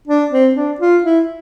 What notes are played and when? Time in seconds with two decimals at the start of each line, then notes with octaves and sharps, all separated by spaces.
0.08 D4
0.31 C4
0.55 D4
0.80 F4
1.03 E4